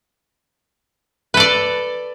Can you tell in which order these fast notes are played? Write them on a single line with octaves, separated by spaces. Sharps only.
B4 A4 D5